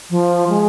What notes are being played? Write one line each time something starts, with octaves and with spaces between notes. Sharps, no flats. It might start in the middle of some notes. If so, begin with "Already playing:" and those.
F3
G#3